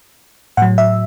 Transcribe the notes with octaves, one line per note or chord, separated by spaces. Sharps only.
A2 F#3 F#5
E5